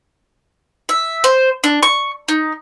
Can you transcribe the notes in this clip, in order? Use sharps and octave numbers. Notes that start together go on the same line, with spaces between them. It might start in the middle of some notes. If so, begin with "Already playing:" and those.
E5
C5
D4
C#6
D#4